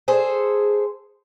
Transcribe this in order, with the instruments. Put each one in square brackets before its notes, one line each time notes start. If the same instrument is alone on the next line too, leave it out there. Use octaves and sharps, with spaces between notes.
[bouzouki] G#4 A4 C5